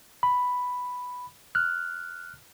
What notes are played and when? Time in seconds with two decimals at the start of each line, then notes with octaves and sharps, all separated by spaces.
0.23 B5
1.55 F6 F#6